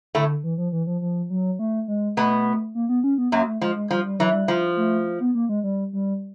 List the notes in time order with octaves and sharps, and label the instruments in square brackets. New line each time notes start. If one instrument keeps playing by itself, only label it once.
[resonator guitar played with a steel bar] A2 A3 [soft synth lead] D3
[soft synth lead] E3
F3
E3
F3
F3
F#3
A3
G#3
[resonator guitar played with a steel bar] B2 B3 [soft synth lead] A3
[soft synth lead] A#3
B3
C#4
B3
[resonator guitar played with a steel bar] F#2 F#3 [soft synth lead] A#3
[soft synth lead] A3
[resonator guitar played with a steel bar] F3 [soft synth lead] G#3
[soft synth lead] G#3
[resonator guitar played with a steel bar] F3 [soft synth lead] G3
[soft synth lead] G3
[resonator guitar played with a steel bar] E3 [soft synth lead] F#3
[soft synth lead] G3
[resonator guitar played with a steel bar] F3
[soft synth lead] A3
B3
A#3
G#3
G3
G3